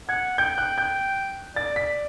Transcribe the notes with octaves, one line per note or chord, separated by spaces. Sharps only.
F#5 G#6
G5 G6
F#6
G6
D5 A6
B6